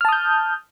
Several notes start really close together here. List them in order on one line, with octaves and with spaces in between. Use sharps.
F6 A5 D#6 G6